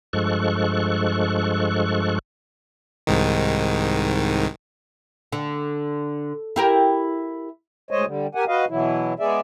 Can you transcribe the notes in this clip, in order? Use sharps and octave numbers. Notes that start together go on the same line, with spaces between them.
G2 F3 G#3 A4 C#6 F#6
C2 G#2 D#3
D3
E4 G4 A#4
D2 G#3 C5 C#5 D#5
D3 G3
G4 A#4 F#5 G#5
F#4 B4 D#5 F5
B2 E3 F#3 E4
G#3 B3 G#4 D5 E5